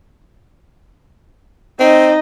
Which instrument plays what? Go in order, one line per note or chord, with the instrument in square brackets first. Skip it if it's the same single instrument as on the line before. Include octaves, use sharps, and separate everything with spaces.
[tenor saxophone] C4 [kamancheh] D#4 D#5